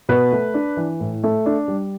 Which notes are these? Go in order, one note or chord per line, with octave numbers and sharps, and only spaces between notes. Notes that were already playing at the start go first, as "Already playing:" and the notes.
B2 B4
A3
D4
E3
A2
A3
D4
G3